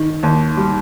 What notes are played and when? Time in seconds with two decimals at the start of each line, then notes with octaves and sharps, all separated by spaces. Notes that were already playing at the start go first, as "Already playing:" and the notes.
Already playing: D#3
0.23 D#2
0.57 G3